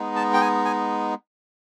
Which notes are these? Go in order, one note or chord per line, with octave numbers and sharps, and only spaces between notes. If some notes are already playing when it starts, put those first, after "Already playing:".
Already playing: G#3 B3 D#4
A5
G5
G#5
G#5